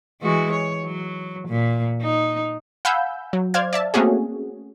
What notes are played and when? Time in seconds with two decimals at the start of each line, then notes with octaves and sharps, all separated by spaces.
0.21 E3 G#3 F#4
0.52 C#5
0.85 F#3
1.48 A#2
2.01 D#4
2.85 F5 F#5 G#5 B5 E6 G6
3.33 F#3
3.54 C5 D5 F5 F6 G#6
3.73 D5 E5 A5
3.94 A3 A#3 C4 C#4 F#4 G#4